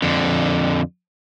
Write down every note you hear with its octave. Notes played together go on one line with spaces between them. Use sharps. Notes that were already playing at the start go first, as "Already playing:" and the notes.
F2 D3